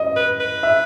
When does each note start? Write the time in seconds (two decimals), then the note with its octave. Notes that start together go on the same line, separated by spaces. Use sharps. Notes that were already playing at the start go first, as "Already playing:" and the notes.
Already playing: D#5
0.16 B4
0.40 B4
0.63 E5